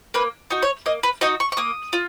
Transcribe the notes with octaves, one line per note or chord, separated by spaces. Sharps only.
A#3 B4
D#4 F#4
C#5
A#3 D#5
B4
D#4 F#4 D#5
C#6
C#6
A#3 D#6
F4